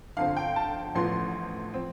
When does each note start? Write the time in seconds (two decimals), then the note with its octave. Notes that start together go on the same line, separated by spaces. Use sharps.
0.17 G1 F2 D3 F3 C4 F5
0.37 G5
0.56 A5
0.95 A1 A2 F3 B3 C6
1.74 F3 C4